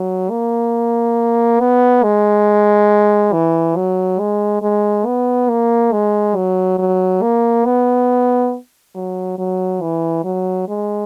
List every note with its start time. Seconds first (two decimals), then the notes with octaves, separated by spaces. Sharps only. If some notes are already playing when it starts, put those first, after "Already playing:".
Already playing: F#3
0.30 A#3
1.60 B3
2.03 G#3
3.33 E3
3.76 F#3
4.20 G#3
4.62 G#3
5.06 B3
5.49 A#3
5.92 G#3
6.36 F#3
6.79 F#3
7.22 A#3
7.66 B3
8.95 F#3
9.38 F#3
9.81 E3
10.24 F#3
10.68 G#3